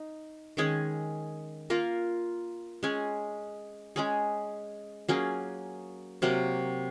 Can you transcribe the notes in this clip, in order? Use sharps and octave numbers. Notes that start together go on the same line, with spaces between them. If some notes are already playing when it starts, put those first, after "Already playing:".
Already playing: D#4
D#3 G#3 C#4 G#4
A#3 F4 A#4
G#3 C#4 G#4
G#3 C#4 G#4
F#3 A#3 C#4 G#4
C3 F#3 A#3